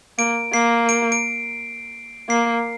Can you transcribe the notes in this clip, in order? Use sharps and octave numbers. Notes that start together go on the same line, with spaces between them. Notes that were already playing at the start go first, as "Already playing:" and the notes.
A#3 D7
A#3 C7
D7
D7
A#3 C7